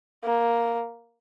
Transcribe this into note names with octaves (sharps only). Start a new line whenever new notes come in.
A#3